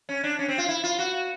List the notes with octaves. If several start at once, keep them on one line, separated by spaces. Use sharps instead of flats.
C#4
D4
C#4
C4
F4
E4
F4
F#4